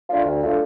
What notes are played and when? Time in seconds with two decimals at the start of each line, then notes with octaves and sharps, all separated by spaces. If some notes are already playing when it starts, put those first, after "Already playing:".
0.09 A3 D4 F4
0.25 D2
0.42 D3 A3 D4 F4